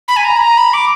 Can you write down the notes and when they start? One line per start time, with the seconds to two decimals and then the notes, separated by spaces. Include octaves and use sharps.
0.08 B5
0.16 G#5
0.25 A#5
0.37 B5
0.41 A#5
0.57 B5
0.73 D6